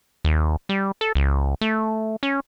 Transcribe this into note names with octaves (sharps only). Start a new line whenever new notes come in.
D#2
G3
A4
C#2
A3
C#4